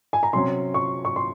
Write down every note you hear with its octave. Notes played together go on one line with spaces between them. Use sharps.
G#5
A#5
C3 F#3 C#4 C6
C#6
C#6
C6